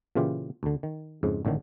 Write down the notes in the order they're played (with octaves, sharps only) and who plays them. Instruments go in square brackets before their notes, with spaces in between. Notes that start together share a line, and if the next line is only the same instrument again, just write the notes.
[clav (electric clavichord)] A#2 C#3 E3 F4 G4
D2 D3
D#3
F2 G#2 C#3
G#1 A2 D3 D#3